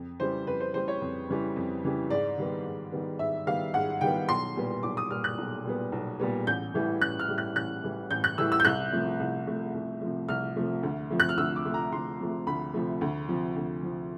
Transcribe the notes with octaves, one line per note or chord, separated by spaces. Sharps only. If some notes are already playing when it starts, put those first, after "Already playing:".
Already playing: F2
C#3 E3 G3 C5
F2 B4
C5
C#3 E3 G3 C5
C#5
F2
C#3 E3 G3
F2
C#3 E3 G3
G#2 D5
D#3 G3 B3
G#2
D#3 G3 B3
G#2 E5
D#3 G3 B3 F5
G#2 F#5
D#3 G3 B3 G5
B1 C6
A#2 G3 B3
B1 D6
D#6
A#2 G3 B3 F6
F#6
B1
A#2 G3 B3
B1
A#2 G3 B3
A1 G6
A2 E3 G3
A1 F#6
F6
A2 E3 G3
F#6
A1 F#6
A2 E3 G3
A1 G6
F#6
A2 E3 G3 E6
E6
G6
C2 F#6
C3 F3 A3
C2
C3 F3 A3
C2
C3 F3 A3
C2 F6
C3 F3 A3
D2
C3 F3 A3
F#6
F6
D2 E6
D6
C3 F3 A3
A#5
D2 C6
C3 F3 A3
D2 B5
C3 F3 A3
D2
C3 F3
D2
C3 F3